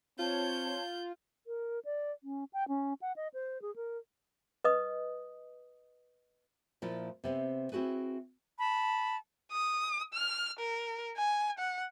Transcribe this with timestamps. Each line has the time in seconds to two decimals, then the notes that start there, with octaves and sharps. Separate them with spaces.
0.19 C4 F4 C#5 A5 G6
1.47 A#4
1.85 D5
2.24 C#4
2.53 G5
2.68 C#4
3.02 F#5
3.16 D#5
3.34 C5
3.62 G#4
3.76 A#4
4.64 B4 D#5 D#6
6.82 A#2 F3 E4 F4
7.24 C3 B3 C4
7.72 C4 E4 F#4 G#4 B4
8.58 A5 B5
9.52 D#6
10.13 F6
10.59 A#4
11.17 G#5
11.59 F#5